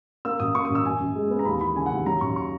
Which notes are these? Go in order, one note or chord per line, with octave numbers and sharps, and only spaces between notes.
A#3 E6
F#2 D#6
A#3 C#6
D#6
F#2
E6
F#2 G#5
F#2
G#3
B3
A#5
D#2 B5
E3 B5
C#3 G#5
F#5
D#2
F#3 A#5
F#2 C#6
C#6